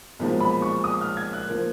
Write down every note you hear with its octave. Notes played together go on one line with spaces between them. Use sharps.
B1 A#2 F3 G#3
B5
C#6
D#6
F6
G#6
F#6
F3 A#3